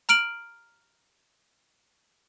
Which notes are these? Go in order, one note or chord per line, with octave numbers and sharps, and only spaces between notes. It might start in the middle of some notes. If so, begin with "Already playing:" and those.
A#5 F6 D7 F#7